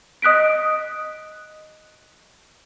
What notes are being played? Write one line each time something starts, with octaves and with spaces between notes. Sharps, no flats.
D#5 D#6 F#6 B6 D7